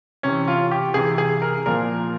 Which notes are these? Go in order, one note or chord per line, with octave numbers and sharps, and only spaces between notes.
C3 E3 C#4
F4
G4
C3 E3 G#4
G#4
A#4
A#2 F3 A#4